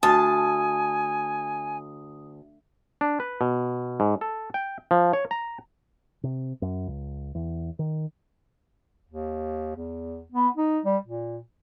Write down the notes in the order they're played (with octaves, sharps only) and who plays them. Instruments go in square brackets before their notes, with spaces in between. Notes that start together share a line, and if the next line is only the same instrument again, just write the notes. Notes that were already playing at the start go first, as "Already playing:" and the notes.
[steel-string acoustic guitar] D2 [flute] G#5 [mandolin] A5 [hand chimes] D#6
[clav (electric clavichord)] D4
B4
B2
G#2
A4
G5
F3
C#5
A#5
[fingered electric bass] C3
F#2
C#2
E2
D#3
[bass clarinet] D#2
E2
B3
D#4
G3
A#2